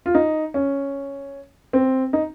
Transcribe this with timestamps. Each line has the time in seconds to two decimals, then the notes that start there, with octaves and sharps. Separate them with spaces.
0.06 F4
0.15 D#4
0.54 C#4
1.73 C4
2.13 D#4